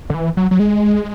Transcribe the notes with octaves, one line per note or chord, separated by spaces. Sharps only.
D3
E3
F#3
F#3
G#3